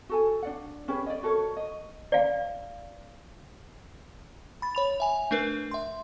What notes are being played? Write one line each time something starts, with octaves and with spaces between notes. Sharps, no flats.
F#4 A4 G#5
D4 D5 F#5
C#4 G4 G#4 B4
D5 D#5
F#4 A4 A#4 C#5
D#5
D5 F5
B5 A6
C#5 B5 F7
E5 G#5 F7
A3 D4 A#4 B4
E5 C6